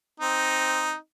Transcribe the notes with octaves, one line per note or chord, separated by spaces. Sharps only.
C4 D#4